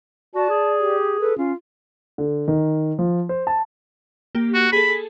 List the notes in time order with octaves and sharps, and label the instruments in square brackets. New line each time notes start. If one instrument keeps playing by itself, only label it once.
[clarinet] F#4 [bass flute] D5 [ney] A5
[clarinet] G#4
[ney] G4
[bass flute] A4 [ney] B4
[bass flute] C#4 [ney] F4
[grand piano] D3
D#3
F3
C5
A5
[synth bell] A#3 G4
[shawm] F#4
[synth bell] G#4 A4 [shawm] B5